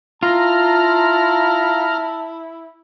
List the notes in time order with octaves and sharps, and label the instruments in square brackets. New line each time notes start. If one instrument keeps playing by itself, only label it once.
[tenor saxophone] E4 [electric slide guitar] F4 [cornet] A5 [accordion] A#5 F6